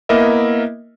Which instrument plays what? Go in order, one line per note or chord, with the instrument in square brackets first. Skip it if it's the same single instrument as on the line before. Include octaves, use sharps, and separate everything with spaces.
[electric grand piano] A#3 B3 E4 A#4 D#5 E5